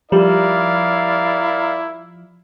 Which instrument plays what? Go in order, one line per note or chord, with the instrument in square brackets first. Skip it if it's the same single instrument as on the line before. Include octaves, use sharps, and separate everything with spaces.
[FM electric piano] F3 [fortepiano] G3 [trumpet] E4 [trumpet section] A#4 D5 F5